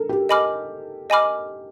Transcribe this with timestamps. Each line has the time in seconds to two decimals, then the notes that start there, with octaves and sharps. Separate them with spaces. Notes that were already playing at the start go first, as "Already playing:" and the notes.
Already playing: A4 A#4
0.09 G4
0.29 D#5 G#5 B5 D6 F6
1.10 D#5 G#5 B5 D6 F6